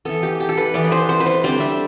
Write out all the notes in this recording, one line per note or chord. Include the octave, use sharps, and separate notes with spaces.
E3 B3 A4
G4
G4
A4
B4
E3 B3 D5
B4
C5
C5
B4
C5
D3 G3 C4 D5
E5